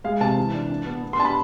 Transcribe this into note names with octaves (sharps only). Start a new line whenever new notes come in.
G#3 F5
C3 A5
E3
D4
D4
B3
B3
C6
D4 A5
B5